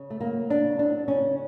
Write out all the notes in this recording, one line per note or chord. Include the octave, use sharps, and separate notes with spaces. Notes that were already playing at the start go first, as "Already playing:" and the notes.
Already playing: C#3
A3
F#3 A#3
C#3 D4
F#3 D4
C#3 C#4